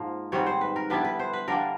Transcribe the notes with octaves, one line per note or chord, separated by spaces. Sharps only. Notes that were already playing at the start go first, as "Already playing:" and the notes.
Already playing: G#2 F3 A#3
G#2 D#3 G3 C4 C#5
C5
B4
A#4
D3 G3 B3 E4 B4
B4
C5
B4
D3 G3 A#3 A#4